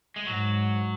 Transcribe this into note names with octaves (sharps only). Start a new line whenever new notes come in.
G#3
G#2 F#3